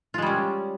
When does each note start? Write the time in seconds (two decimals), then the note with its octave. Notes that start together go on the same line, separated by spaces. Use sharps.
0.14 F4
0.18 G#3
0.22 G3
0.26 C#4